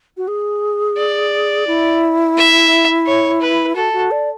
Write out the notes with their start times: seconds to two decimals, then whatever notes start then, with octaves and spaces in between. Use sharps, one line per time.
0.17 F#4
0.28 G#4
0.97 D5
1.67 E4
2.37 E5
3.06 C#5
3.41 B4
3.76 F#4 A4
3.93 F#4
4.11 D5